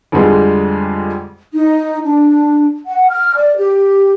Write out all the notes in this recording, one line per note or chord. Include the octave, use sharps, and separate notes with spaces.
F2 D3 G3 G#3
D#4
D4
F#5
F6
D5
G4